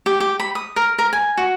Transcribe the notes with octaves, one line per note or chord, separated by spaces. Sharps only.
G4
G4
B5
D#6
A#4
A#4
G#5
F#4